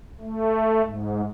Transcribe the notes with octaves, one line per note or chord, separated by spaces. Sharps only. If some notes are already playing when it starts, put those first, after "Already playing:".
A3
G#2